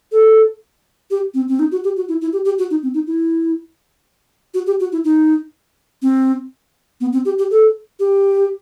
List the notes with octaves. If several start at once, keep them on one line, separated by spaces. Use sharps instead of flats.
A4
G4
C4
C4
D#4
F#4
G4
F#4
E4
E4
G4
G4
F#4
D#4
C4
D#4
E4
F#4
G4
F#4
E4
D#4
C4
B3
C4
G4
G4
A4
G4